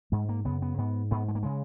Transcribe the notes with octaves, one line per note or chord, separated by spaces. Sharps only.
G#2 G#3
A#3
F#2 C#3 B3
B3
G#2 B3
G#2 B3
G#3
A#3
C#3 G#3